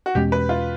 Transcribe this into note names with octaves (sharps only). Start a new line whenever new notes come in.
F#4
E2 B2 G#3 C#4 G4
B4
F4